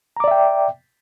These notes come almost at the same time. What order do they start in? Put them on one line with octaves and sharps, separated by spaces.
A#5 D6 D5 E5 G5